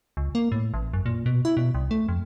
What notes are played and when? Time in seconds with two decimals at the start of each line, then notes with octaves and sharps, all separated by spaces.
0.17 C#2
0.35 A#3
0.52 A2
0.74 A1
0.93 F#2
1.06 A#2
1.26 B2
1.45 E4
1.57 B2
1.75 C2
1.91 A3
2.08 F2